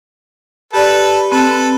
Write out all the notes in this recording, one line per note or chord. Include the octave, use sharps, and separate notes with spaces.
G4 A4 B4 D5
C4 A4 B4